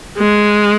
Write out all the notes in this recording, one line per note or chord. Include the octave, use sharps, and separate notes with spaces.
G#3